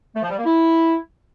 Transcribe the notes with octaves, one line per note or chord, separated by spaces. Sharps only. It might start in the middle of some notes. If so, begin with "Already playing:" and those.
A3
F3
G3
A#3
E4